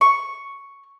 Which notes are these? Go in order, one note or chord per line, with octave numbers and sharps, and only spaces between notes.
C#6